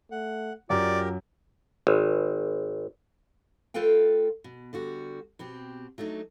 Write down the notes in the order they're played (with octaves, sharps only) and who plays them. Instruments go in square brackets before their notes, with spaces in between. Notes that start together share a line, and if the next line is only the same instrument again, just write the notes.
[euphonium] A3 [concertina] F#5
[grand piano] F#2 [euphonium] F4 [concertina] G4 A#4 [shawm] D5
[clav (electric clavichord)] G#1
[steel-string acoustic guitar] A3 F4 A4 B4 F5 G5
B2
D3 G3 F#4
B2 C4 G4
F#3 A3 D4 D#4